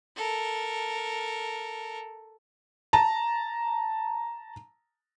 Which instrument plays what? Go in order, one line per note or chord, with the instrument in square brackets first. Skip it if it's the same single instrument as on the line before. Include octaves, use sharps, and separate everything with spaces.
[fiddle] A4 A#4
[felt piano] A5 A#5